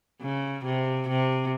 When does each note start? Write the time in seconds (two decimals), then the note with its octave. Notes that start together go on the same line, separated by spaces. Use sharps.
0.22 C#3
0.65 C3
1.09 C3